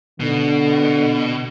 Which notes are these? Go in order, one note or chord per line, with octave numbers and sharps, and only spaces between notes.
B2 D3